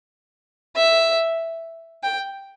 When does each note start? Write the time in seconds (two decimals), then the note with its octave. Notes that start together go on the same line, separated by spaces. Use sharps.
0.76 E5
2.03 G5